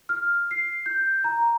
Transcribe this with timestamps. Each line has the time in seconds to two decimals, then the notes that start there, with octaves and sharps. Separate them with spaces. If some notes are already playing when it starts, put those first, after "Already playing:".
0.09 F6
0.51 C7
0.86 G6
1.24 A#5